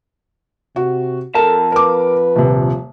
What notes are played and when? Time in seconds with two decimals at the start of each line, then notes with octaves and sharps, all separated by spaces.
0.76 C3 F#4
1.35 F2 A4 A#4 A5
1.72 A#4 B4 D6
2.36 D#1 C3